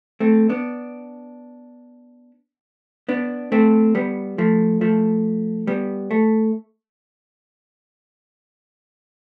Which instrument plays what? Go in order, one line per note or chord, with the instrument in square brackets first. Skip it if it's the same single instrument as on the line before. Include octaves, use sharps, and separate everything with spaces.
[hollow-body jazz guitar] A3 C4
B3 D4
B3 D4
A3 C4
G3 B3
F3 A3
F3 A3
G3 B3
A3